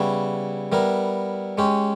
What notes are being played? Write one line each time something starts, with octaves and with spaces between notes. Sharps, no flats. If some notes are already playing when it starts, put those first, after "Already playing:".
Already playing: C#3 G3 B3 E4
G3 B3 E4 A#4
G#3 C#4 G4